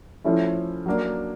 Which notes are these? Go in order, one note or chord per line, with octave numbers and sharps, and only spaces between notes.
F3 A3 C#4 E4
F#3 A#3 D4